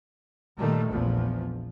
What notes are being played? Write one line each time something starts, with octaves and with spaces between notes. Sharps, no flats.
A#2 D#3 G3 A3
A#1 E2 F3